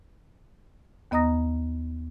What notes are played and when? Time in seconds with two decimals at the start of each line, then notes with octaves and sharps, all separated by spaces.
1.11 D#2 B3 D#5 A#5 D#6 A#6